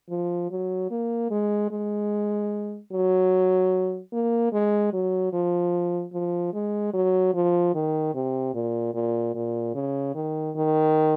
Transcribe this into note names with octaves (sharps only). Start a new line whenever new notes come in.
F3
F#3
A#3
G#3
G#3
F#3
A#3
G#3
F#3
F3
F3
G#3
F#3
F3
D#3
C3
A#2
A#2
A#2
C#3
D#3
D#3